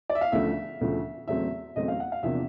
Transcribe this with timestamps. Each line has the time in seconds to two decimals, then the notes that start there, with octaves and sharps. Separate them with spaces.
0.10 D5
0.15 E5
0.21 F5
0.32 D2 C#3 F3 A3 E5
0.81 D2 C#3 F3 A3
1.28 E2 C#3 F#3 A3 C4 E5
1.76 E2 C#3 F#3 A3 C4 D#5
1.88 F5
2.00 F#5
2.12 F5
2.23 E2 C3 F3 A#3 D4 E5